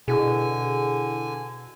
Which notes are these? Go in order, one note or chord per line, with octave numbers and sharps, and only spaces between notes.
B2 D3 E4 G#4 G#5